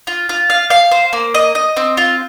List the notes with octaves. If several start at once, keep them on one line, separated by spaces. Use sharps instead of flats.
F4
F4
F5
F5
C5
A#3
D#5
D#5
C4
F4